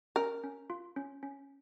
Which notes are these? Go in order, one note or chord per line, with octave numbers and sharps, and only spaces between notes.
C#4 A#4
C#4
F4
C#4
C#4